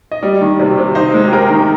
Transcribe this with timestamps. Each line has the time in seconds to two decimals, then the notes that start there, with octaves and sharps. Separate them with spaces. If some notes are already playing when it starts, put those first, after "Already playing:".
0.12 D#5
0.22 G3 D5
0.41 D#3
0.59 C3 D5
0.78 C3
0.95 D#4 C5
1.14 G#3
1.28 G4
1.32 G#4 A#4
1.50 D#3